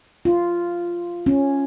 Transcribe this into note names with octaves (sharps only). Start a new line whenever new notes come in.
F4
C#4